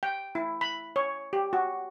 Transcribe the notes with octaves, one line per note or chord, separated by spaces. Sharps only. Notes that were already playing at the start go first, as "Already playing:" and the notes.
G5
E4
B5
C#5
G4
F#4